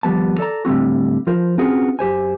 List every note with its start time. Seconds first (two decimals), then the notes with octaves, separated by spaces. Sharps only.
0.03 D#2 F3 G3 B3 A5
0.38 A4 D5 A5 A#5
0.65 A2 D3 G3 C4 F#4
1.27 F3 F4 A#4 C5
1.58 C4 C#4 F4 F#4 G#4 B4
1.99 F#2 G4 C5 G#5